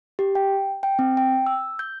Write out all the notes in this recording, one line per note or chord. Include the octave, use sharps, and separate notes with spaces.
G4
G5
G5
C4
G5
E6
G6